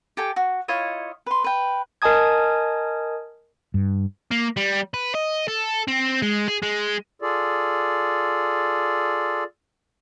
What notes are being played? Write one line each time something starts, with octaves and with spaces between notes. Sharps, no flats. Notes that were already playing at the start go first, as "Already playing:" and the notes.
G4 A4 G5 G#5
F#4
E4 F4 C#5 D#5
B4 C6
B4 G5
A#4 D#5 G#5 A5 D#6 G#6
G2
A#3
G3
B4
D#5
A4
C4
G#3
G#4
G#3
F4 G#4 A4 D5